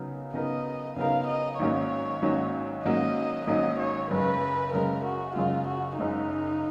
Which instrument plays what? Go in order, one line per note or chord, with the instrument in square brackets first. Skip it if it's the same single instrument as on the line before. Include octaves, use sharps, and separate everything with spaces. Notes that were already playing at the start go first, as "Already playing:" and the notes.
Already playing: [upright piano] C#3 F#3 B3 D#4 A#4
[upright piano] C#3 F#3 B3 D#4 A#4 [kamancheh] D#5
[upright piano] C#3 F#3 B3 D#4 A#4 [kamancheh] F5
[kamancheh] D#5
[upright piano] G#1 G#2 F#3 A#3 C#4 [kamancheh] C#5
[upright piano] G#1 G#2 F#3 A#3 C#4
[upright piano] G#1 G#2 F#3 A#3 C#4 [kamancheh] D#5
[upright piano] G#1 G#2 F#3 A#3 C#4 [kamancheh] D#5
[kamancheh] C#5
[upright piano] F#1 F#2 C#3 G#3 [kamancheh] B4
[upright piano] F#1 F#2 C#3 G#3 [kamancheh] A#4
[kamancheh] F#4
[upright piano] F#1 F#2 C#3 G#3 [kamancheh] F4
[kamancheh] F#4
[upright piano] F#1 F#2 C#3 G#3 [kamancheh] D#4